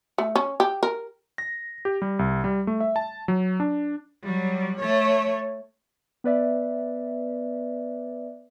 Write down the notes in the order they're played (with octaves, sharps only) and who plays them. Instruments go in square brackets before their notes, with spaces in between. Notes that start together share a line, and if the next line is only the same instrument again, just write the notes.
[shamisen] A3
C#4
G4
A#4
[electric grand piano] A#6
G4
G3
C2
G3
A3
E5
A5
F#3
D4
[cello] F#3 G3
A3 C#5
[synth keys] B3 B4 D5 E5